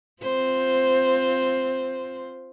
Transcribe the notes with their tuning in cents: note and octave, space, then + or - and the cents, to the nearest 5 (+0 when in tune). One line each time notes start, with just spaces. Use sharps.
C4 +0 F4 +0 C5 +0